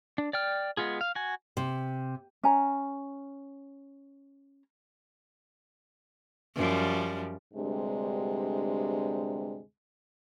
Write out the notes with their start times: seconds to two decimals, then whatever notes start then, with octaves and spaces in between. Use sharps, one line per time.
0.18 D4
0.33 D5 G5 F6
0.77 G#3 B3 F4 G#4
1.01 F5
1.15 F#4 G#5
1.57 C3
2.44 C#4 G#5 A#5
6.56 F#2 F3 G3
7.53 D2 G2 C3 G#3